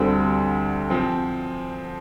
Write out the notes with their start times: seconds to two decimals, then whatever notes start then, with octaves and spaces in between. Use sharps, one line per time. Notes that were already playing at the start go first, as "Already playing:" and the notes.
Already playing: D2 D3 G3 C4
0.90 F3 C4